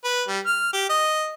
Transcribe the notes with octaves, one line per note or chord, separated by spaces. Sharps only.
B4
G3
F6
G4
D#5